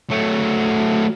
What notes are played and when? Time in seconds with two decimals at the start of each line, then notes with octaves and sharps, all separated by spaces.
0.10 F#3 A3